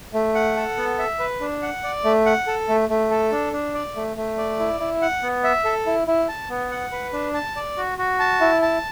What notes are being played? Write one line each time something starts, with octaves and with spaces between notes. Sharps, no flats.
A3
F#5
A4
B3
E5
B4
D4
F#5
D5
A3
F#5
A4
A3
A3
A4
D4
D4
D5
A3
A3
D5
E4
E4
F#5
B3
E5
A4
E4
E4
A5
B3
F#5
B4
D4
A5
D5
F#4
F#4
A5
E4
A5